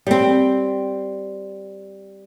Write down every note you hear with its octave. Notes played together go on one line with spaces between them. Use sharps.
G3 C4